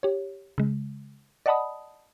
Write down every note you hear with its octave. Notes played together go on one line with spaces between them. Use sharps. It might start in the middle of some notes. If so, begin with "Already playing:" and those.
G4 C#5
C#3 G#3
D5 D#5 F#5 A5 B5 D#6